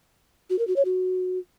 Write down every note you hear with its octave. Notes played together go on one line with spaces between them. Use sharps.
F#4
A#4
F#4
C#5
F#4